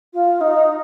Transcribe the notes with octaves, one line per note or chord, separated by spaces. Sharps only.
F4
D#4